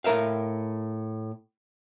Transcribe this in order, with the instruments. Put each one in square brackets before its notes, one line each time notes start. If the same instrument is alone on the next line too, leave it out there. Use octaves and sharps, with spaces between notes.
[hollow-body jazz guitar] A2 A#4 E5 F5